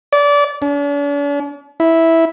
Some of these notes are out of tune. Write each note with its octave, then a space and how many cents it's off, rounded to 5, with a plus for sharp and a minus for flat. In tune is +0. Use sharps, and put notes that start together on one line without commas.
D5 -25
D4 -45
E4 -10